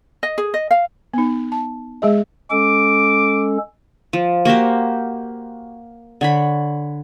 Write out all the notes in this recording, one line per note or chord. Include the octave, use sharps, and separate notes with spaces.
D#5
G#4
D#5
F5
B3 D#4
A5
G#3 G#4 D#5
G#3 C#4 A4 D6
F3
A#3 F#4 G4 C5
D3 C#5 B5